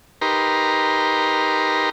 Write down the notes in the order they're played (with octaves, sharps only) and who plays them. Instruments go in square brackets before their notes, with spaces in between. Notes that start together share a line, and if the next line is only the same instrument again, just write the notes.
[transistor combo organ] D#4 G4 A#4 B4 A#5 C6